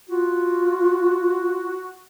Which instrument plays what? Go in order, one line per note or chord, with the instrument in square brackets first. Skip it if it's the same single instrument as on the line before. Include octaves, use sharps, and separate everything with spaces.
[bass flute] F4 [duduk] F#4